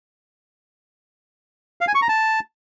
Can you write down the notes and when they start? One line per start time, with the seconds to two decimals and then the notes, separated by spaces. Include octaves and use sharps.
1.81 F5
1.88 G#5
1.95 C#6
2.02 A#5
2.09 A5